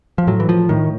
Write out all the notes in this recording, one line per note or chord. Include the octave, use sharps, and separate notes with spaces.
F3
A2 F#3
E3
F3
A2 D#3